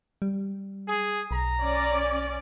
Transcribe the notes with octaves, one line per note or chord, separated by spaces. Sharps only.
G3
G#4
B1 A#5
C#4 D5